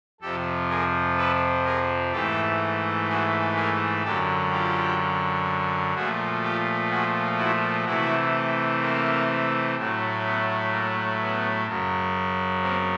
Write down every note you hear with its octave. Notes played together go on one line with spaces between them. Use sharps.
F2 C3 F3 G4 A4
G#4 A#4
A4 B4
G#4 A#4
G#2 E3 A3 G4 A4
F#4 G#4
G#4 A#4
F#2 D3 F#3 G4 A4
F4 G4
A#2 F3 A3 F#4 G#4
F4 G4
F#4 G#4
E4 F#4
C3 E3 A3 E4 F#4
A#3 C4
A2 F#3 A3
B3
A#3
B3
F#2 C#3 F#3
A#3 C4